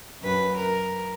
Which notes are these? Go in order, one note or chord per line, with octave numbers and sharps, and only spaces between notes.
F#2 B4
A#4